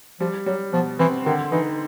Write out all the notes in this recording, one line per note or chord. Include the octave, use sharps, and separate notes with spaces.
F3 G3
F#3 G3
B2 F3
E3 C4
D3 D#3
E3 D#4